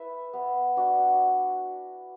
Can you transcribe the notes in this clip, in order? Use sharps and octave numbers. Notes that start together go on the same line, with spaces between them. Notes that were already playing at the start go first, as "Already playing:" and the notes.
Already playing: E4 B4 E5
B3
D4 F#4